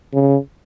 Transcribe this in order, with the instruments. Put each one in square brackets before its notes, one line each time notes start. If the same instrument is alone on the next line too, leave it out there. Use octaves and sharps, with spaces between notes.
[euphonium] C#3